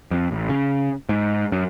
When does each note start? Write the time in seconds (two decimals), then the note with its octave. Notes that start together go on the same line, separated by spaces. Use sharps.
0.11 F2
0.31 A1
0.49 C#3
1.09 G#2
1.52 F#2